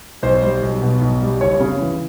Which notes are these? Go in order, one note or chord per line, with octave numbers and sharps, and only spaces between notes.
B1 C5
G3
B1
B2
B1
G3
F#1 C#5
C#3
E3